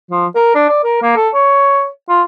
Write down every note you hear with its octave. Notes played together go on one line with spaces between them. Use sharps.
F3
A#4
D4
D5
A#4
A#3
A4
C#5
F4